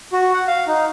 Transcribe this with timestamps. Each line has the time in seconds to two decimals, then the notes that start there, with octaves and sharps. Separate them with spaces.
0.13 F#4
0.34 F#5
0.48 F5
0.67 D#4